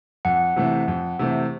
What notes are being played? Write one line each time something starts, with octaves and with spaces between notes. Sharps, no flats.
F2 F#5
C3 E3 A3 C4
F2
C3 E3 A3 C4